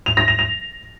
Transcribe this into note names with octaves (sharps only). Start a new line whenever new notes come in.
F7
A#6
F7
F7